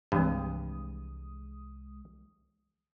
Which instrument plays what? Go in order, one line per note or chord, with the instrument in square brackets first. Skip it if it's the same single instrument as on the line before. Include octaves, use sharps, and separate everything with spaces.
[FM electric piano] C2 G#3 D#6 [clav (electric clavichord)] G2 [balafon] E3 F3 C4